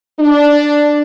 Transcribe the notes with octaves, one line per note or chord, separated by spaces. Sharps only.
D4